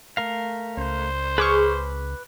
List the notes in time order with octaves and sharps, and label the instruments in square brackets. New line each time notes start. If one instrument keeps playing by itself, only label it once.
[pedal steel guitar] A3 A#4 F5
[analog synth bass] C#2 [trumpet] C5
[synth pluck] G#4 C#6 [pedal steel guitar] B4 D6 F6